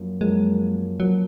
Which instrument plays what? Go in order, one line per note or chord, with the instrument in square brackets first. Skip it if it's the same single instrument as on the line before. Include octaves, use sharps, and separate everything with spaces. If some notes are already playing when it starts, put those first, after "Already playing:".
Already playing: [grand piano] F#2 F3 A#3
[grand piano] F#2 F3 A#3 [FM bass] G#3
[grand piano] F#2 F3 A#3 [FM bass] F#3